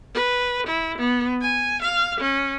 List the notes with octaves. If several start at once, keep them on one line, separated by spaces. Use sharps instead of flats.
B4
E4
B3
G#5
F5
C#4